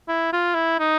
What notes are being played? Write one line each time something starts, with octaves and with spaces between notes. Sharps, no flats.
E4
F4
E4
D#4